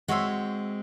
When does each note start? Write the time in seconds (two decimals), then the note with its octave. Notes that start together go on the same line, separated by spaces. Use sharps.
0.08 G#3 C4 F#4 C#5 E5 C6